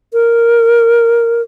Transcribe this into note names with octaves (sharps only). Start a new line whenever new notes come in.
A#4